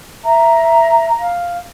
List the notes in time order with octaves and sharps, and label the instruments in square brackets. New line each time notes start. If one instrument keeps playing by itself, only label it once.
[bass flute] E5 [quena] A#5
[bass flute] F5